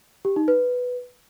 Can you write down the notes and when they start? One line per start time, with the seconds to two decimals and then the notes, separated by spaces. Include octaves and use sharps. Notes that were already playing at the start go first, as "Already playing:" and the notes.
0.25 G4
0.36 D#4
0.48 B4